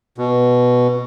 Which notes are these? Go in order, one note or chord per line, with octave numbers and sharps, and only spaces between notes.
B2